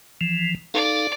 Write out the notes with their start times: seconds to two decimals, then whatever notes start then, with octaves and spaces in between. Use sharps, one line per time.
0.21 E3 F3
0.74 D#4 A4 D5 F5